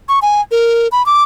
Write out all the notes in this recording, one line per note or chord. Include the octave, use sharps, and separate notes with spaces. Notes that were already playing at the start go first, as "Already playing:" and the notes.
C#6
G#5
A#4
B5
D6